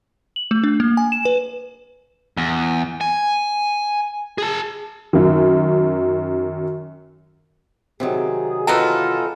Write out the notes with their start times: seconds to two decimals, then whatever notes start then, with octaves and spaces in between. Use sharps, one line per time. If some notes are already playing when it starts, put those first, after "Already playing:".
0.36 F#7
0.51 A3
0.64 D4
0.80 A#3
0.97 G#5
1.12 E7
1.25 B4
2.37 E2
3.01 G#5
4.38 G#4 A5
5.13 F#2 D#3
8.00 C3 D#3 F#3 G#4
8.67 E3 B3 D#4 F4 A4 A#5